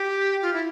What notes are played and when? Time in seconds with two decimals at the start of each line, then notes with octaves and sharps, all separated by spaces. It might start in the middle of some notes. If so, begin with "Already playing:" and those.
Already playing: G4
0.42 F4
0.54 E4